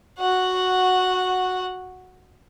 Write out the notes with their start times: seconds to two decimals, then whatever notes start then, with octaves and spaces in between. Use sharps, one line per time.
0.19 F#4 F#5